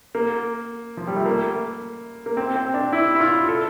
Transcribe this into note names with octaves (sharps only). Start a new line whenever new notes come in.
A#3
F3
G3
A3
A#3
A#3
C4
C4
D4
E4
E4
F4
A4